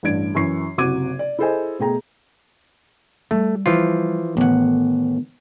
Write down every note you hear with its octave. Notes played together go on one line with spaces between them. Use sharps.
A1 G2 D4 G#6 D7
F#2 E3 C#6 C7
F#1 C3 F#4 D6 G#6 D#7
D5
E4 G#4 A4 C5 D#5 G#5
B2 A3 G#4 G5 A#5
G3 A3
E3 F3 F4
A1 D#3 B3 F#5